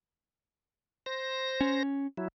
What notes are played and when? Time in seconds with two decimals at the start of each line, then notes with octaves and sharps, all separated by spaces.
1.06 C5 A#6
1.61 C#4
2.17 F#3 E4